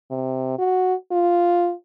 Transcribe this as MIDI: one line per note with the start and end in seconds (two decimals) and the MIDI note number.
0.11 0.59 48
0.59 0.94 66
1.12 1.73 65